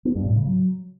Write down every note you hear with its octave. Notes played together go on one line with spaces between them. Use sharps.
B3
G2
A2
C#3
F#3